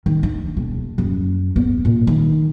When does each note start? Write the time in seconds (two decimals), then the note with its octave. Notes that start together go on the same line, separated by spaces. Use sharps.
0.06 D#3
0.23 D4
0.57 E1
0.98 F#2
1.56 B3
1.85 A#2
2.07 D#3